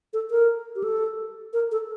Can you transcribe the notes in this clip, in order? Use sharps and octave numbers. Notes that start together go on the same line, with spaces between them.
A4
A#4
G4
A4
A#4
A4